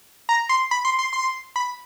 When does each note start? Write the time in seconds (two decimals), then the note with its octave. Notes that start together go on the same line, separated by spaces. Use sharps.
0.29 A#5
0.49 C6
0.71 B5
0.85 C6
0.99 C6
1.13 C6
1.56 B5